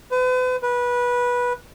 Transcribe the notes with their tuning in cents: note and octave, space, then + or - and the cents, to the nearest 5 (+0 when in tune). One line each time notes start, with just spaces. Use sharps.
B4 +40
B4 -20